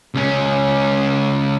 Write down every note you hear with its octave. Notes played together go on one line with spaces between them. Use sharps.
C#2 C#4